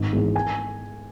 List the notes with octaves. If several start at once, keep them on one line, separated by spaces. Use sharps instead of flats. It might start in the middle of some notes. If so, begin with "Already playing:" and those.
Already playing: G#1
G#2 E3 G#3 B3
G#5